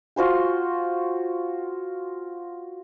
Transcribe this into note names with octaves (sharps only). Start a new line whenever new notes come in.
F4 F#4 C5 G#5